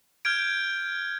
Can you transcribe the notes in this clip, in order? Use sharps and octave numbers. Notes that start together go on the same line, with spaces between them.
F6 G6 G#6 D7